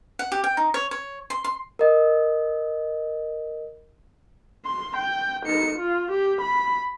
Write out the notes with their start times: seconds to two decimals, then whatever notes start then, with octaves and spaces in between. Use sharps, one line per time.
0.19 F#5
0.32 G4
0.44 G5
0.57 D#4
0.74 C#5
0.91 C#5
1.30 C6
1.44 C6
1.79 A#4 D#5
4.65 C6
4.97 G5
5.46 D#4 C#7
5.79 F4
6.12 G4
6.41 B5